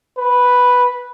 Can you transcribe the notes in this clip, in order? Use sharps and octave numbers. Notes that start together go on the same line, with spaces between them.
B4